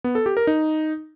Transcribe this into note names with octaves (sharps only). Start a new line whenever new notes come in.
B3
A4
G4
A#4
D#4